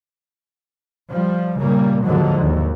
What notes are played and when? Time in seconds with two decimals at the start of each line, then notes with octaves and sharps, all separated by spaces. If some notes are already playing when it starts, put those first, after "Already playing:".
1.11 F3 G3
1.60 A#2 C#3 G3 A#3
2.03 D#2 G#2 D3 D#3 F3 F#3
2.41 D#2